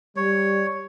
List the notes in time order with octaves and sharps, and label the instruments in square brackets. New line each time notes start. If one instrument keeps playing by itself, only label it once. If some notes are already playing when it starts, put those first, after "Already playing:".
[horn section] G3 [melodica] C#5